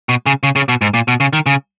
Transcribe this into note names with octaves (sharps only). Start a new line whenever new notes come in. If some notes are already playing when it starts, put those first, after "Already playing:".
B2
C#3
C#3
C#3
B2
G#2
A#2
B2
C#3
D#3
C#3